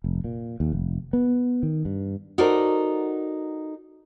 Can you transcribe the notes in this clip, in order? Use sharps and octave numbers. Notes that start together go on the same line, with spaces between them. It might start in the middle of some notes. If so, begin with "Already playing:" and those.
F1
A#2
D#2
F1
B3
D#3
G2
D#4 F#4 A4 A#4 C5 D5